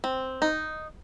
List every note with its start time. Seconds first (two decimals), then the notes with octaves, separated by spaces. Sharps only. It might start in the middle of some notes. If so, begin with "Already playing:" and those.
0.04 C4
0.42 D#4